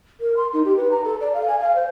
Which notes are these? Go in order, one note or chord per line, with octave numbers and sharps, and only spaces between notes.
A#4
C6
D#4
G4
B4
A#5
A4
D5
F5
G#5
F5
C5